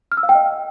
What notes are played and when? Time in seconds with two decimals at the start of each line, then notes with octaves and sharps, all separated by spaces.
0.12 F6
0.17 E6
0.23 F5
0.29 G5
0.35 D#5